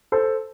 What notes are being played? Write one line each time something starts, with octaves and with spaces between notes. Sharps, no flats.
A4 C5